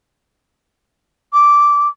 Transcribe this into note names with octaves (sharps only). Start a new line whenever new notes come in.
D6